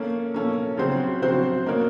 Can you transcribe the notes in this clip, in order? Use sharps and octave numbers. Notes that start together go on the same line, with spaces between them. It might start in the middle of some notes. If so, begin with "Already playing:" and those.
Already playing: A#3 C#4 A4
A#3 C#4 A4
C#3 F#3 C4 F#4 C5
C#3 F#3 C4 F#4 C5
A#3 D#4 A#4 C#5